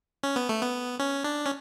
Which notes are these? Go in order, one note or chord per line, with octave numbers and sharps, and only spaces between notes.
C#4
B3
A3
B3
C#4
D4
C#4